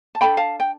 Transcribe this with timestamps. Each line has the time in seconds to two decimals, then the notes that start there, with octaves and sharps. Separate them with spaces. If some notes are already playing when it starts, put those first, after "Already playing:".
0.15 A5
0.21 D4 A4 G5 B5
0.37 F5 A5
0.60 G5